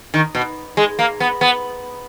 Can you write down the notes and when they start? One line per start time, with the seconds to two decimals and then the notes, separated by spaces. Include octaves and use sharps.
0.14 D#3
0.35 B2
0.77 G#3
0.99 A#3
1.20 B3
1.41 B3